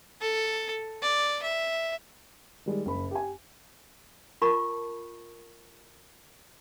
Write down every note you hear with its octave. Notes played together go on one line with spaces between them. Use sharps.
A4
D5
E5
D#3 G3 G#3
F#1 B5
G4 G#5
F4 A#4 A5 B5 C#6